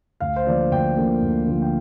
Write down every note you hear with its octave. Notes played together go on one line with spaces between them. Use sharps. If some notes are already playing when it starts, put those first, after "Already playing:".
D2 F5
C5
D3 F3 A#3 D5
D2 G5
D3 F3 A#3
D2
D3 F3 A#3
G5